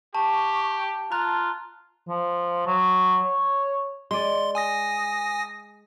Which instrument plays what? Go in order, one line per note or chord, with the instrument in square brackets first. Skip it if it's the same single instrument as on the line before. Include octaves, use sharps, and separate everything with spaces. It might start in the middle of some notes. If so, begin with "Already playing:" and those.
[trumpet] G4 [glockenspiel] A5 [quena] C#6
[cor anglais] F4 [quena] A5 [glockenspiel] A#5 F#6
[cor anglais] F3
F#3
C#5
[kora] G#3 D5 [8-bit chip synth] C6
[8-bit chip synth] G#5 D#6 A#6